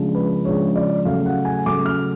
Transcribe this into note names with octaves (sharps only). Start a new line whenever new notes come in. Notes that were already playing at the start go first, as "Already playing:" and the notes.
Already playing: C#3 F3 G#3 D4
B4
C#3 F3 G#3 D4 C#5
D5
C#3 F#3 A3 F5
F#5
G#5
C#3 F#3 A3 D6
F6